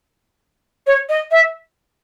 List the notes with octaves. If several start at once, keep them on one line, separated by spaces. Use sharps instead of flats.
C#5
D#5
E5